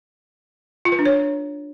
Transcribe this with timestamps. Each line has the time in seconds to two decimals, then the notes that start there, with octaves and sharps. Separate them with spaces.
0.85 F4
0.92 B4
0.99 D4
1.05 C#5